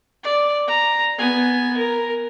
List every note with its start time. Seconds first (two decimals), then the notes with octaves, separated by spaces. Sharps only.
0.24 D5
0.67 A#5
1.18 B3 G#5
1.78 A#4